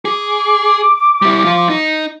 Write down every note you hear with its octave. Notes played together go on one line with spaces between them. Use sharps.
G#4 D6
G3 E4
F3 F4
D#4